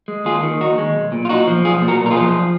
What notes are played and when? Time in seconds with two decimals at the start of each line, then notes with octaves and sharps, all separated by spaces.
0.08 G#3
0.25 D#2 F4 G#4
0.43 D#3
0.60 D#2 D#4 F#4
0.78 G#3
0.95 B1
1.12 A#2
1.25 F4
1.29 B1 D#4 F#4
1.47 F3
1.64 B1 F4 G#4
1.82 A#2
1.88 F#4 A#4
2.00 B1
2.06 A#4
2.11 F4 G#4
2.17 F3